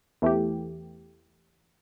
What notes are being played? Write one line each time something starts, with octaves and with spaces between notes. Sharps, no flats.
E2 E3 A3 G4